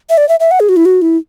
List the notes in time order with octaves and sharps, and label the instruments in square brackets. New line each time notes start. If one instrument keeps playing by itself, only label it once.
[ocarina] E5
D5
E5
E5
F#5
G#4
F#4
E4
F#4
E4